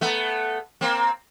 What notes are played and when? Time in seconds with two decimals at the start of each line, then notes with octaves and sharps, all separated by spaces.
0.01 A3 B3
0.81 A#3 C4